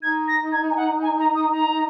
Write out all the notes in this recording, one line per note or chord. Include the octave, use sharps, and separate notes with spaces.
D#4 G#6
A#6
G#6
G#5
F#5
G#5
A#5
D#6
A#5